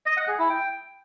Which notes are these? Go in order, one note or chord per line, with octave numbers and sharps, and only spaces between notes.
D#5
F#5
G#4
E4
G5